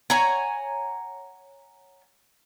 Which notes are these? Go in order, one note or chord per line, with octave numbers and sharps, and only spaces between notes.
C#5 F#5 G#5 A#5